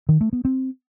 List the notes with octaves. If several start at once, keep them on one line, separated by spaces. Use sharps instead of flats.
D#3
A3
B3
C4